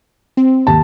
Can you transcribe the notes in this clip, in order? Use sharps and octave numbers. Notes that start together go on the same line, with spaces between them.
C4
D#2 G4 A5